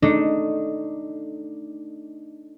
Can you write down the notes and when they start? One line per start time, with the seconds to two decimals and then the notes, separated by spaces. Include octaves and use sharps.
0.02 A3 D4 D#4